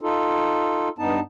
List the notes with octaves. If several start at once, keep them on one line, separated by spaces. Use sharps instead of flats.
D#4 F4 A4
G2 B3 D#4 A5